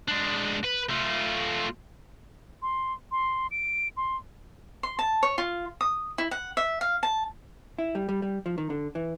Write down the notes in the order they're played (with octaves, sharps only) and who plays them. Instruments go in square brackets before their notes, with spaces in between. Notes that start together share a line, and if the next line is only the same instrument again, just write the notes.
[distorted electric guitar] G#3 D4
B4
A3 F4
[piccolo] C6
C6
D7
C6
[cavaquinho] C6
A5
C#5
F4
D#6
E4
F#5
E5
F5
A5
[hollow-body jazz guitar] E4
G3
G3
G3
F3
D#3
D3
E3